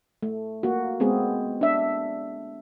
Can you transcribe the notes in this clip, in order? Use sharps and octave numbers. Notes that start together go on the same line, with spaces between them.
A3
A#3 F#4
G#3 B3 C4 G#4
D4 E5